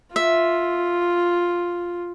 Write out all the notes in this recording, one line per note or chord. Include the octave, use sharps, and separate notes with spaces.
F4 E5